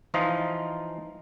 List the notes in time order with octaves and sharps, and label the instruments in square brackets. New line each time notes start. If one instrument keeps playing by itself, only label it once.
[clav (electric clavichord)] E3 F3 D#4 F4 D#5 F5